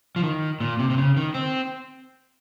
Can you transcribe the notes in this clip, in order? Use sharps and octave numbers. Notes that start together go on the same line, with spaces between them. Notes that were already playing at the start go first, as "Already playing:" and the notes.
F3
D#3
A#2
C3
C3
C#3
D#3
C4